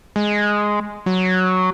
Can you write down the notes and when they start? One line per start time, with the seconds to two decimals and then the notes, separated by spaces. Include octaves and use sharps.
0.16 G#3
1.06 F#3